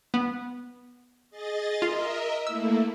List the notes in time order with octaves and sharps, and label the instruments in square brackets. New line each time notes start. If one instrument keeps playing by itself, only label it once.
[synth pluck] B3
[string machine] G#4 D#5 A6
[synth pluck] F4 [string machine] A#4 D#5 E5
[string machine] A3 A#3 E4 [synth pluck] E6